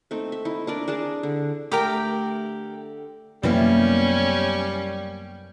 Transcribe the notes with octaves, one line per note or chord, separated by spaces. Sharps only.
A3 C4 D#4
E5
D#4 E4
D4 A#4 D5
D4 G#4 A#4 A5
D3
D3 A3 G4 A#4 G5
F#2 C3 E3 G3 A#3 B3 C#4 E4